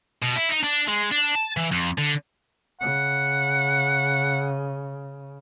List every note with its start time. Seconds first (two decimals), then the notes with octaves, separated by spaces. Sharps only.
0.23 B2
0.37 E4
0.51 D#4
0.64 D4
0.88 G#3
1.11 D4
1.35 A5
1.57 E3
1.72 F2
1.98 D3
2.81 C#3 F#5